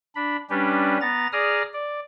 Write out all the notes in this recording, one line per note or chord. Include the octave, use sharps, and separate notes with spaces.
D4 B5
G3 C#4 D4 G4 B4
B3 A#5 A6
G#4 D5 A#5 D#6 F6
D5